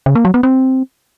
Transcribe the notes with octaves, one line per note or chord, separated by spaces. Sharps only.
C#3
A#3
F#3
B3
C4